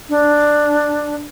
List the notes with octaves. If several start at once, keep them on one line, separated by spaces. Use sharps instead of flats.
D4